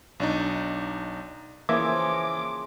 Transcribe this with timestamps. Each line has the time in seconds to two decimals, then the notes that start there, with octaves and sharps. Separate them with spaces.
0.20 B1 D4 D#4
1.69 C#3 E3 F3 A#3 E5 A#5 D6 G#6